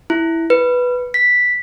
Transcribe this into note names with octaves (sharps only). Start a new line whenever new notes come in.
E4
B4
B6